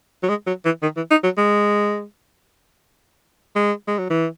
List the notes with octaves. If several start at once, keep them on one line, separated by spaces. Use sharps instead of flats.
F#3
G#3
F#3
E3
D#3
E3
D#4
F#3
G#3
G#3
G#3
F#3
E3